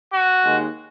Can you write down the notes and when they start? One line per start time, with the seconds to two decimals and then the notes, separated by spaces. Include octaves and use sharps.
0.12 F#4
0.45 D#2 D#3 G#3